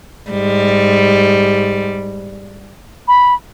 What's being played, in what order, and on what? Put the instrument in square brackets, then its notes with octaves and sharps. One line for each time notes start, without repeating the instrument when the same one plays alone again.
[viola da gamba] G#2 G3
[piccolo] B5